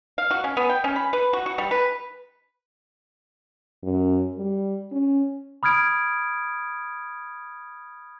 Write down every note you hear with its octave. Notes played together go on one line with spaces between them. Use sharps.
F5
F#4
C#4
B3
G5
C#4
B5
B4
F#4
F#4
G3
B4
F#2
G3
C#4
B5 D#6 F6 G#6 D7